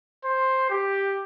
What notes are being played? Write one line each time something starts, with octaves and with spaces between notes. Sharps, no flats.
C5
G4